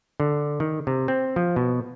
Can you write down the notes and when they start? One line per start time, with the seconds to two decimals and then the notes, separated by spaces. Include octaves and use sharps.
0.20 D3
0.60 D#3
0.87 C3
1.08 C4
1.36 F3
1.56 B2